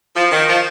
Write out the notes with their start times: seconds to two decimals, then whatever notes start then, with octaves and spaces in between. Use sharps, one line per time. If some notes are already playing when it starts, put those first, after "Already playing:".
0.16 F3
0.31 D#3
0.48 F3